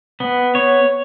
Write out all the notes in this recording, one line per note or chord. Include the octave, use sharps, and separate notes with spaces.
B3
C#5